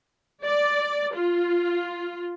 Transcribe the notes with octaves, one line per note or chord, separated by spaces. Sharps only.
D5
F4